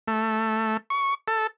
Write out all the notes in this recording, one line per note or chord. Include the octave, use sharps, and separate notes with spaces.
A3
C#6
A4